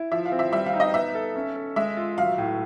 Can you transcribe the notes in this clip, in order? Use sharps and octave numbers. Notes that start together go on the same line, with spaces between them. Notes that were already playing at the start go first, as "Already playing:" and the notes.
Already playing: E4
F3 E5
F5
C4
E5
G3 E5
F5
D#4
D#5
B3 E5
A4
C#4
A4
G#3 E5
F4
F#3 F5
A2